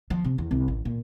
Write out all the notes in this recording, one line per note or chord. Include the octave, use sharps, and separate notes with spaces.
F3
C3
E2
C2
A1
A#2